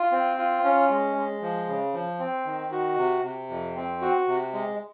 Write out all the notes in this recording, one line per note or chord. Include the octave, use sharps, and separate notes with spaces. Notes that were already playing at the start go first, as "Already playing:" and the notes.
Already playing: F4
C4
F4
C#4
G#3
G#3
F3
C#3
F3
C4
D#3
F#4
C3
C3
F2
C4
F#4
C3
G#3